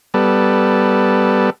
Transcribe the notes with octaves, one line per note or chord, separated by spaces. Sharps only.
G3 B3 A4